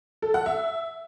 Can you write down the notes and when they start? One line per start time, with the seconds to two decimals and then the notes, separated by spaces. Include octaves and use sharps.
0.22 A4
0.34 F#5
0.46 E5